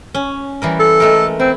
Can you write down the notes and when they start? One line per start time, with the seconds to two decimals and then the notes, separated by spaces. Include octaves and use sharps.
0.14 C#4
0.62 E3 G3 A#4
0.80 A4
1.00 G#3 A3 A#4
1.40 C4 E4